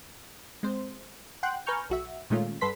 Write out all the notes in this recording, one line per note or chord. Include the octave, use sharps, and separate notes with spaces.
G#3 C4 C5
F#5 G5 C6 F#6
B4 G#5 A#5 C#6 F6 G6
B1 F#4 E5
A#2 D#3 G#3 A3 C#4 F4
G2 A4 B4 C6 B6